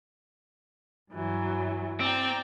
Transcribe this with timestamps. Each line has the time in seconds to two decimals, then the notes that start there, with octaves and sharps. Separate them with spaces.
1.11 G2 E3 F#3
2.00 C4 D5 G5 A#5